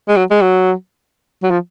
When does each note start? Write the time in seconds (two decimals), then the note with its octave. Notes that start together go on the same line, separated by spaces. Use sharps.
0.09 G#3
0.16 F#3
0.31 G#3
0.42 F#3
1.43 F#3
1.51 F3